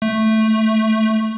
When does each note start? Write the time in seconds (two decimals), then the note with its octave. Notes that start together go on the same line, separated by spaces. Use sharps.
0.02 A3